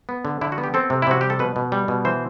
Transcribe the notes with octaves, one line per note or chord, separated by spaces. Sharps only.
B3
D3
D3 E4
F#4
B3
G4
C4 A4
C3
E4
C3 F#4
G3 G4
A4
B2 B4
B2
G3
B2
E3 C5